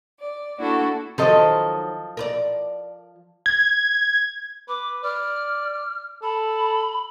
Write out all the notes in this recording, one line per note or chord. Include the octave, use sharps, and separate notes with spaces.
D5
A#3 D4 E4 F#4 A4
D#3 F3 F#3 A4 C5 D#5
A#4 B4 D5
G#6
B4 D6
D5 F6
A4 B5